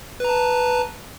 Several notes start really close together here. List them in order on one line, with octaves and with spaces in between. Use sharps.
B4 A#5 A5